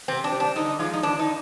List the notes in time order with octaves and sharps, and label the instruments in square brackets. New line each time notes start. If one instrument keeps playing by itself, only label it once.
[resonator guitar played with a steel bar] C3 C4
D4
G3
D4
D3 D#4
F3 G#3 F4
D#4
D3 D4
D#4